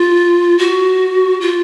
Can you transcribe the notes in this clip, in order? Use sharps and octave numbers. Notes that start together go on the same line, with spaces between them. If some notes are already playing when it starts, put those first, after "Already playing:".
Already playing: F4
F#4
F4